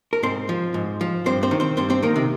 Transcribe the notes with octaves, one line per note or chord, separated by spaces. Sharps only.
A#4
G#2 C4 C5
F3
G#2
F3
G2 C4 C5
C4 C5
D#3
C4 C5
G2 C4 C5
C4 C5
D#3 A#3 A#4
C3 C4